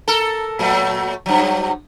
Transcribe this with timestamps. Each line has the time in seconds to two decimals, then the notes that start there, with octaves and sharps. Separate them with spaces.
0.08 A4 A#4
0.59 A#2 F#3 A3
1.26 G2 F#3